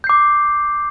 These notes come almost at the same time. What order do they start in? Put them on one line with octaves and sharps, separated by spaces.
G6 C7 D6